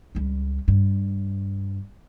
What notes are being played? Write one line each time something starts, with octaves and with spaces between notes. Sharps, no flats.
C#2 G3
G2